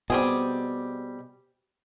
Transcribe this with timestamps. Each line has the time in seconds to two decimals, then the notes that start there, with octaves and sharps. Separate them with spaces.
0.10 B2 G3 C4 G#4